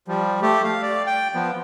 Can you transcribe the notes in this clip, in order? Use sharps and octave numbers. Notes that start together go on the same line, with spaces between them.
F3 G3
A3 G4
F5
D5
G5
F3 B3